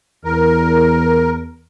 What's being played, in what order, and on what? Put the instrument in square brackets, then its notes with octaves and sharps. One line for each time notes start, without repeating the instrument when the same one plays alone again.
[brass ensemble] E2 [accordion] A#4